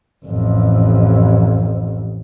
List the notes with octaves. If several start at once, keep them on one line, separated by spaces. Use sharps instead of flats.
A1 F2